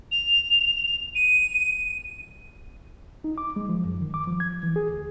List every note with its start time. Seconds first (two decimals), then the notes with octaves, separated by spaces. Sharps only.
0.11 F7
1.15 D#7
3.24 D#4
3.38 D6
3.56 G#3
3.69 F3
3.85 F#2
4.01 D#3
4.14 D6
4.28 F3
4.40 G#6
4.63 E3
4.76 G#4
4.89 D2